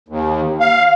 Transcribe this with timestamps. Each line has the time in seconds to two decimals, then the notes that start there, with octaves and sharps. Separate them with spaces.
0.09 D#2
0.60 F5